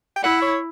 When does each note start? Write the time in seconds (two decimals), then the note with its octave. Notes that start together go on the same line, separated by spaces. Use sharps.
0.16 G5
0.23 E4 F#5
0.42 C#5